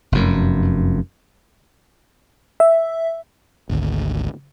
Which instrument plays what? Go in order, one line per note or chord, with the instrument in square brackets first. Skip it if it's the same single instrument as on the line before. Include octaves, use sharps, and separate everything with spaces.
[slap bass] F1 F#2
[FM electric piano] E5
[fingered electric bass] G#1 D2